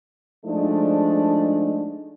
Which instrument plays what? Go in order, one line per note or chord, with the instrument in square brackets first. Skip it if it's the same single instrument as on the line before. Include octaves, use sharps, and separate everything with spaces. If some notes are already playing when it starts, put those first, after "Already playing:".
[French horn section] F3 G#3 A3 D4 D#4